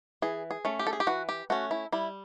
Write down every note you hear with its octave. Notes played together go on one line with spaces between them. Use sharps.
E3 G#4
G#4
A3 C#4
G4
A4
G#4
G4
E3 F#4
G4
A3 C#4 F#4
E4
G3 E4